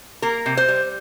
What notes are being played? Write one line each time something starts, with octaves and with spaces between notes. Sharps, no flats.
A#3 A#4
C3
C5
G3